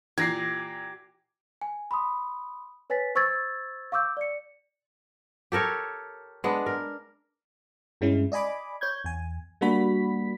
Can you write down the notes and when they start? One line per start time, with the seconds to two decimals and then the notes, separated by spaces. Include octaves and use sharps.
0.18 A#2 E3 G4 G#6 A#6 C7
1.62 G#5
1.91 B5 C6 D#6
2.90 B4 C#5 G#5 A6 B6
3.15 C5 C#6 E6 G#6 A6
3.92 F5 C#6 D6 E6 G6
4.17 D5 C#7
5.52 G4 A4 A#4 C#5
6.44 G#3 B3 D4
6.66 A#4
8.01 G2 G#3 C#4 E4
8.32 D5 D#5 G#5 B5 D6
8.81 C#5 G6 G#6
9.04 E2 G#5
9.61 G3 A#3 D4 F#4 B5 B6